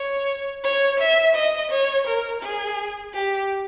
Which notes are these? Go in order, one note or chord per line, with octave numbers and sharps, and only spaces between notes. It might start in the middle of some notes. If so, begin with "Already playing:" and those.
Already playing: C#5
C#5
E5
D#5
C#5
A#4
G#4
G4